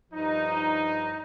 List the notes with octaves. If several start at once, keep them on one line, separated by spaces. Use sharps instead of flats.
G2 F3 D#4